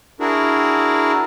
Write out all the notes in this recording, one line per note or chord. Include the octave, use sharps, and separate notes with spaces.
D4 E4 F#4 G#4 A#4